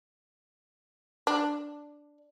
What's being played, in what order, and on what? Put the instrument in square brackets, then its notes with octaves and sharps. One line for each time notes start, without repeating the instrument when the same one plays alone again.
[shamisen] D4